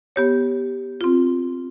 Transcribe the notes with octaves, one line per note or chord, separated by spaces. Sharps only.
B3 G4 C#5
C4 F4